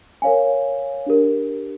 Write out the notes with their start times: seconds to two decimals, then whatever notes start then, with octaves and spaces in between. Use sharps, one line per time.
0.22 A#4 C#5 F5 G#5
1.06 D4 G4 A#4